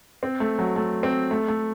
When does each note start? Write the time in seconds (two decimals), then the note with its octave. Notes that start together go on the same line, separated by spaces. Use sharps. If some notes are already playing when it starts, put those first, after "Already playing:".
0.23 C4
0.40 A3
0.59 F#3
0.76 A3
1.03 C4
1.31 A3
1.48 A3